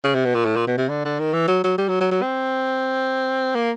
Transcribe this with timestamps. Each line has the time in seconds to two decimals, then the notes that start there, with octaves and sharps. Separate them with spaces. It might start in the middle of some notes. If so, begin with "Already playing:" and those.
0.04 C#3
0.15 C3
0.25 B2
0.35 A#2
0.45 A2
0.56 A#2
0.67 B2
0.78 C3
0.89 D3
1.05 D3
1.19 D#3
1.33 E3
1.48 F#3
1.64 F#3
1.78 G3
1.89 F#3
2.01 F#3
2.11 F#3
2.22 C4
3.55 A#3